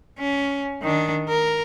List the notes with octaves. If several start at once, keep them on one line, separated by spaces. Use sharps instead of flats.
C#4
D#3 D4
A#4